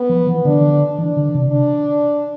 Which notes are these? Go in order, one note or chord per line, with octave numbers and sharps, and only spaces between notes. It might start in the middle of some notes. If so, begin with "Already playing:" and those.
Already playing: B3
F3
E3
D3 D4
E3 D4
D3
C3
D4